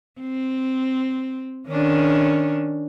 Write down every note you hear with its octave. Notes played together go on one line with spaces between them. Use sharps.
C4
D#3 C#4 D4